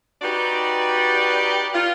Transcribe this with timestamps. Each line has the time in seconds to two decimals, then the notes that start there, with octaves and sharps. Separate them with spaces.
0.22 D#4 F#4 G4 B4 D5
1.73 F4